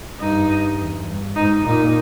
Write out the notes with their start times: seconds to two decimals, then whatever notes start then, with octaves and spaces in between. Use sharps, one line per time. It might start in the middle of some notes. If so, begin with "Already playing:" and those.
0.20 G2 D#4
0.79 E2
1.07 G2
1.36 G#2 D#4
1.65 A#2 D#4